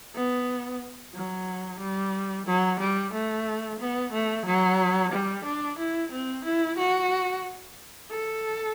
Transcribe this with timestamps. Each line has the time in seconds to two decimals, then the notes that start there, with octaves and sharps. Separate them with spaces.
0.15 B3
1.14 F#3
1.80 G3
2.46 F#3
2.80 G3
3.13 A3
3.80 B3
4.13 A3
4.46 F#3
5.12 G3
5.45 D4
5.78 E4
6.12 C4
6.44 E4
6.78 F#4
8.11 A4